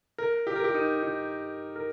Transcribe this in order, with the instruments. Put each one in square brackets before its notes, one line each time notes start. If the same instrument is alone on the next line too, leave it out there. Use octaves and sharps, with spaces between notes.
[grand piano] A#4
G4
A#4
G4
D#4
D#4
A#4